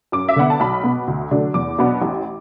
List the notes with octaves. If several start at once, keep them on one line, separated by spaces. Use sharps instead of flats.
F#2 D6
E5
D3 B3 F#5
A5
B1 B5
B2 B3
D2
D3 F#3 A3 D4
E2 D6
B2 F#3 B3 D4
A1